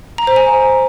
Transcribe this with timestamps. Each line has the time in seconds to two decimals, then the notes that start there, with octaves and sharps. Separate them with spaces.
0.18 A#5
0.27 C5
0.36 G#5